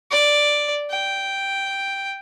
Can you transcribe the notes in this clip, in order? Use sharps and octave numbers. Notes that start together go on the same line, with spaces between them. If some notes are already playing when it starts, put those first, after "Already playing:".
D5
G5